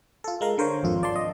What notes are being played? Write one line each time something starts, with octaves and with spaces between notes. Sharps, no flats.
F4 A4
G#3 A#4 F5
D3 A#4 C5 C#5
G#1 F2 F4
D5 A5 C6
D#5